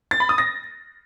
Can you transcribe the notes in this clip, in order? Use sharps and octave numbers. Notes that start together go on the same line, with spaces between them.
A6
B5
D#6
A#6